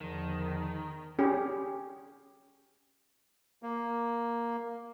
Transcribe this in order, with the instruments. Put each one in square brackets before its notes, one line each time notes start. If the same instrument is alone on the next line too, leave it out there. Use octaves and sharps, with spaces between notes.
[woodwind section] E2 D3 F3 [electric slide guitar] D#3
[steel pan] C#4 G4 G#4
[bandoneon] A#3